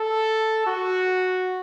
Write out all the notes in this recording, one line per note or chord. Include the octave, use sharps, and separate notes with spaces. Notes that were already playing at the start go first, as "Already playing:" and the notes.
Already playing: A4
F#4